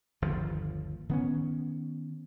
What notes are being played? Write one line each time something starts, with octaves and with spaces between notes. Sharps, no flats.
G1 D#2 F3
D#3 B3 C#4